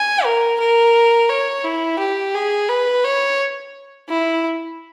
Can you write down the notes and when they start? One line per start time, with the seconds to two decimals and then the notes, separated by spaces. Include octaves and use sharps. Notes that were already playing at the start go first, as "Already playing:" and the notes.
Already playing: G#5
0.24 A#4
0.60 A#4
1.29 C#5
1.64 E4
1.99 G4
2.35 G#4
2.69 B4
3.04 C#5
4.09 E4